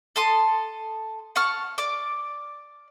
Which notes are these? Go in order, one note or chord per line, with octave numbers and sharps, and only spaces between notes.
A4 A5 C6 D#6
F#5 A5 C#6 F6
D5 D6